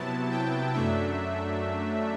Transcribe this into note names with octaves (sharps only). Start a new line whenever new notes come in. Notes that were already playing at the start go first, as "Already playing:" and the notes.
Already playing: C3 F#3 B3 E4 A5
G5
F#2 F#3 A3 D4 E5